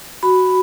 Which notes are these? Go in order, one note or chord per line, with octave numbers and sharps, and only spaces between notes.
F#4 B5